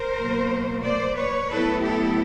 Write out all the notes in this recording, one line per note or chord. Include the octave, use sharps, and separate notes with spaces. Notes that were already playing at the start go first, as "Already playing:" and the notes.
Already playing: A#4 C5
B2 F#3 A#3
C5 D5
B4 C#5
A2 F#3 B3 E4 A4 B4
G4 A4